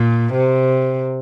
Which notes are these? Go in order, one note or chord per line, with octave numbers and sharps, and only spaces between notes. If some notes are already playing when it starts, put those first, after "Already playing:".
Already playing: A#2
C3